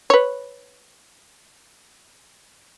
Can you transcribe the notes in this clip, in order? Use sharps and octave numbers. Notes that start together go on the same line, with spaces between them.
B4 C#5